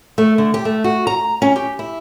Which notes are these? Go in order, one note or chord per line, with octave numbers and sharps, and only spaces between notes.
A3
D3
G4
A3
F#4
A#5
C#4
G4
E4